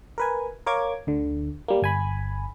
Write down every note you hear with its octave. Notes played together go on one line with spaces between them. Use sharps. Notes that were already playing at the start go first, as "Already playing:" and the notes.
A#4 B4 G#5
A#4 C#5 F5 D6 G#6
D2 D3
G3 A#3
G1 G#5 B5